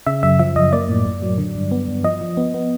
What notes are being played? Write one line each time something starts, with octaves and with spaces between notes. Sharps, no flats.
C#3 E5
F#2 E5
F3 E5
F#2 D#5
A#3 D5
A2
A2
F#3
D3
G2
B3
G2
F3 D#5
F3
B3
B3